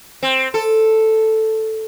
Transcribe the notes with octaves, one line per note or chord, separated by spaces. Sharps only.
C4
A4